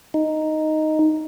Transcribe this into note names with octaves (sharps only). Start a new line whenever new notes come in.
D#4